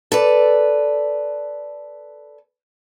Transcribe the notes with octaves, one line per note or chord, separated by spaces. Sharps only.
A4 B4 D5